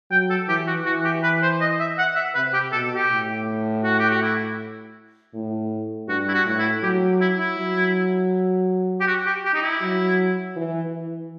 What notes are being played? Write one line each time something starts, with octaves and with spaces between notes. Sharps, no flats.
F#3 G5
A4
E3 G4
F#4
E3 F#4
G4
B4
C5
D#5
E5
F#5
E5
C3 B4
G4
B2 A4
G4
A2
F#4
G4
F#4
E4
A2
G2 F#4
E4
F#4
A2
E4
F#3 G4
E4
E4
F#3
G4
F#4
G4
G4
D#4
E4
F#3
E3
E3